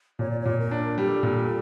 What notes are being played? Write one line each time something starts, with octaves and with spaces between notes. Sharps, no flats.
A#2 C#5
D5
C#5
A#2
A#4
D4
G3 A4
A#2